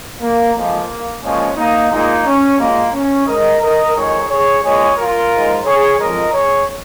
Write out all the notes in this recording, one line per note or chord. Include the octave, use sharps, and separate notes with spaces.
A#3
F2 F3 G#3 A#3
A#2 F3 G#3 C#4
A#3 D#4
A#2 G#3 A#3 D#4
C#4
A#2 G#3 A#3
C#4
G#2 G#3 A#4 D#5
A#4 D#5
F2 D#3 G#3 G#4 C#5
G#4 C#5
A#2 G#3 G#4 C#5
F4 A#4
G#2 G#3
G#4 C#5
F2 F3 G#3 A#4 D#5
G#4 C#5